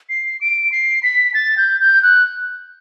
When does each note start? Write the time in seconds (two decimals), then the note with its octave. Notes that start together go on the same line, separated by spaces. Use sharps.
0.09 C7
0.41 D7
0.72 C7
1.03 B6
1.34 A6
1.57 G6
1.80 G6
2.03 F#6